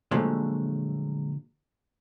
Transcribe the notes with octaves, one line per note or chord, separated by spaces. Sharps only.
A#2 D3 F3 F#3 G#3 A3